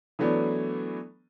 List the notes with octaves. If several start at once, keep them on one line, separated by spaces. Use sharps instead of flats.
E3 F#3 A3 B3 D4